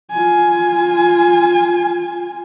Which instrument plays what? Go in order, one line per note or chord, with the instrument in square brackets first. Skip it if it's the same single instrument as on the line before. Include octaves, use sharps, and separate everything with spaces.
[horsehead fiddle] F4 G#5